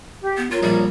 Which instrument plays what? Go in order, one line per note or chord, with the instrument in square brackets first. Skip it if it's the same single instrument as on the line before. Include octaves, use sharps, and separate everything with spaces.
[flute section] G4
[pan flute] B3
[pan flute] F4 [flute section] A#4 C#5
[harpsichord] A#1 [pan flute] G3